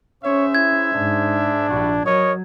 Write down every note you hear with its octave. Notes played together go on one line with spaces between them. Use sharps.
C#4 G#4 C5 C#5 E5
E4 G#6
G#2 D4
A#1 G3 E4 F#4
F#3 A#4 C#5 D#5 D#6